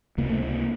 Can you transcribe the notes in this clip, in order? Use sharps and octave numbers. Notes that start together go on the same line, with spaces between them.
C#2 C3 A#3
A3
A#3